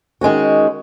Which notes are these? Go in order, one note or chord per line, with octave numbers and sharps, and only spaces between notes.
D#3 G#3 C#4 F#4